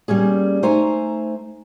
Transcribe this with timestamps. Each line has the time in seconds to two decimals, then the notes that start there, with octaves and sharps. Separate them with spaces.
0.08 G3 A#3 C#4 G#4
0.63 A3 D#4 C5 G#5 A#5